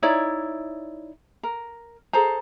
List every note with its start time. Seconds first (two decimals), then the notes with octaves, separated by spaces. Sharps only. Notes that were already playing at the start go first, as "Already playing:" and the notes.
0.02 D#4 E4 C#5 D5
1.43 A#4
2.13 G#4 A4 C5 A#5